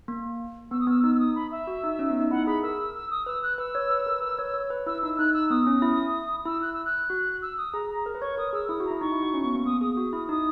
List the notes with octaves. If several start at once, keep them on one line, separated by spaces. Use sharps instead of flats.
A#3
B3 E6
D#6
B3 E6
D#4 E6
E6
D#6
B5
E5
F#4
D#4
C#4
B3
D#4
E4 F#5
G#4 B5
A#4 E6
E6
D#6
B4 E6
F#6
B4 E6
C#5
B4
A#4
B4
C#5
C#5
B4
E4 E6
D#4 E6
E6
D#4 F#6
E6
B3 D#6
C#4
E4
E4 E6
F#6
E6
F#6
F#4
E6
D#6
G#4 A#5
A#5
A#4
B4
C#5 C#6
A#4 D#6
G#4 E6
E4 D#6
F#4
E4 A#5
D#4 C#6
E4
F#4
C#4
B3
A#3
B3 D#6
G#4 D#6
F#4
E4
D#4 D#6